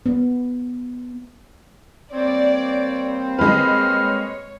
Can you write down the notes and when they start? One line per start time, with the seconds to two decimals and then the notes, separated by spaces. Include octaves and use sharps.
0.06 B3
2.13 G3 A#3 C4 C#5 D5
2.54 C#5
3.39 G#3 B4 C#5 F6